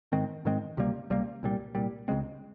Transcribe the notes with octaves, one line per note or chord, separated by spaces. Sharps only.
G#2 D#3 G#3 C4
G#2 D#3 G#3 C4
C#2 C3 G3 A#3
C#2 C3 G3 A#3
C2 A#2 G3
C2 A#2 G3
C#2 C#3 G#3 C4